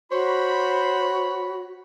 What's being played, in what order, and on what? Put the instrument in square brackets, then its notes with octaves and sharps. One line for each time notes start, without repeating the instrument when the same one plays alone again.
[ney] F#4 [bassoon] C5 [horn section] C#5 B5